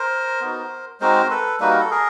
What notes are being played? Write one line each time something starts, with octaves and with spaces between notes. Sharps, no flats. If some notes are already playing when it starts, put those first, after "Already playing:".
Already playing: A#4 C5
B3 D#4 F#4
G#3 C4 D#4 F#4 A#4 C5
A4 B4
G3 A#3 D#4 F#4 B4
A#4
A4
G#4 A#4